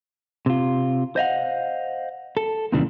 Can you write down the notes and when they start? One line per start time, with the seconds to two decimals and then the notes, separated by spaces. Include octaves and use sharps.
0.46 C3 F4
1.16 C5 D#5 F5 F#5
2.37 A4
2.72 F2 A#2 C#3 E3 G3 D4